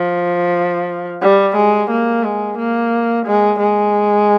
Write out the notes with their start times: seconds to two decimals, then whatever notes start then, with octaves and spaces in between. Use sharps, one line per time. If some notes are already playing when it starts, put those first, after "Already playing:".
Already playing: F3
1.22 G3
1.56 G#3
1.90 A#3
2.24 G#3
2.58 A#3
3.26 G#3
3.59 G#3